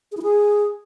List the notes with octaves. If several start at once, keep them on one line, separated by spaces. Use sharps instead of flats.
G#4
E4
G#4